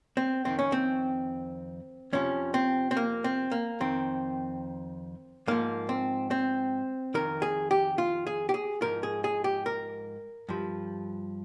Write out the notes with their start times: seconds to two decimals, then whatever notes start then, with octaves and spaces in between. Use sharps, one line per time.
0.17 C4
0.45 F2 D#3 C4
0.59 C#4
0.72 C4
2.13 F2 C3 F3 C#4
2.54 C4
2.91 C4
2.97 A#3
3.24 C4
3.52 A#3
3.80 F2 D#3 C4
5.47 G#2 F3 A#3
5.89 C4
6.31 C4
7.14 F2 D#3 A#4
7.42 G#4
7.71 G4
7.98 F4
8.27 G#4
8.49 G4
8.54 G#4
8.82 G#2 F3 A#4
9.03 G#4
9.24 G#4
9.44 G4
9.66 A#4
10.49 G2 F3